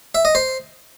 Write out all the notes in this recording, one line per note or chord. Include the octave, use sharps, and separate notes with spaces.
E5
D#5
C5